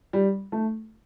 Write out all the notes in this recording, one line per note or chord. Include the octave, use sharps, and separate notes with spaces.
G3
A3